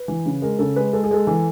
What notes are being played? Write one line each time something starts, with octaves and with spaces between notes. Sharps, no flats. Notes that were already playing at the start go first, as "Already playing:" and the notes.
Already playing: B4
E3
C#3
G#3 A#4
C#3 A4
G#3 B4
G#3 A4
G#4
G#3 A4
E3